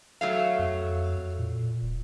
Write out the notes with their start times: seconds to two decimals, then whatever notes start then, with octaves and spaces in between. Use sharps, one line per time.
0.21 F#3 A3 F5
0.59 F2
1.39 A#2
1.83 D#1